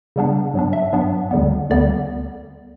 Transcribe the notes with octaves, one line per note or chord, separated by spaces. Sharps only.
C#3 G3 B3 D4
G2 F#3 B3 D4
E5
G2 F#3 B3 D4
D2 D3 G3 B3
D2 D3 G3 B3 D5